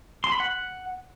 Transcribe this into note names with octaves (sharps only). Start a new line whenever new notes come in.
C6
B5
F#5